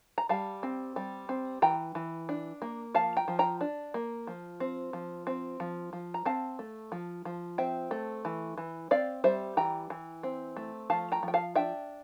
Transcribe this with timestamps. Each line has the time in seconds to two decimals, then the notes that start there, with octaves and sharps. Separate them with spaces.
0.18 A#5
0.29 G3 F5 A5
0.63 C4
0.96 G3
1.29 C4
1.62 E3 G5 A#5
1.95 E3
2.29 D4
2.62 A#3
2.95 F3 F5 A5
3.17 G5 A#5
3.28 F3
3.39 G5 A#5
3.61 D4
3.94 A#3
4.27 F3
4.60 C4
4.93 F3
5.27 C4
5.60 F3
5.93 F3
6.14 A#5
6.26 C4 F5 A5
6.59 A3
6.92 F3
7.25 F3
7.58 C4 E5 G5
7.91 A3
8.25 E3
8.58 E3
8.91 C4 D5 F5
9.24 G3 C5 E5
9.57 E3 G5 A#5
9.90 E3
10.23 C4
10.57 A3
10.90 F3 F5 A5
11.12 G5 A#5
11.23 F3
11.28 G5
11.34 F5 A5
11.56 D4 E5 G5